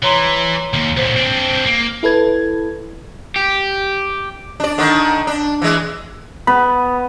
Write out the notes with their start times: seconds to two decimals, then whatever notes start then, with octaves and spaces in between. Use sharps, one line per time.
0.03 E3 C#5 A#5 C6
0.74 D#2
0.97 D2 A#2 C5
1.16 C4 D4
1.66 A#3
2.03 E4 A4 B4 G#6
3.36 G4
4.60 D4 D5
4.78 D3 D#3 D4
5.27 D4
5.62 E3 G#3
6.47 B3 B5